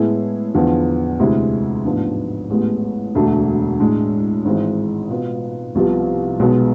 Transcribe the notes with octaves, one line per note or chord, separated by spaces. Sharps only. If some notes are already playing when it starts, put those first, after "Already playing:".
Already playing: A2 G#3 B3 E4 G#4
E2 D3 F3 B3
D2 C3 G#3 C4 E4
A1 G#2 F3 B3 D4
A1 A2 G#3 B3
E1 D2 D3 A3 D4
A2 G#3 D4
G#1 G#2 E3 G#3 C4
B2 B3 F4
C2 C3 F3 B3 F4
B1 B2 G#3 B3